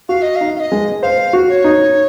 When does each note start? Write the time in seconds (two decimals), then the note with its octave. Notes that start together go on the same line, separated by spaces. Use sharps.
0.09 F#4 F5
0.22 D#5
0.36 F5
0.41 D#4
0.56 F5
0.60 D#5
0.72 G#3
1.03 C5 F5
1.33 F#4
1.49 C#5
1.64 D#4